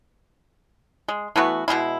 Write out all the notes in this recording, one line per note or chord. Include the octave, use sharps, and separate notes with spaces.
G#3
E3 A3 B3 F#4
B2 D#3 G#3 E4